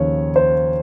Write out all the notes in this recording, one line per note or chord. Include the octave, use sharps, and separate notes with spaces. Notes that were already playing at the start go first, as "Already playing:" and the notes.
Already playing: D#2 C#3 F3 C#5
C5